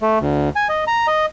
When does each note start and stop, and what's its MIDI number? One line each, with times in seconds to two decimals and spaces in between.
0.01 0.19 57
0.20 0.49 38
0.56 0.68 80
0.69 0.84 75
0.87 1.07 82
1.07 1.26 75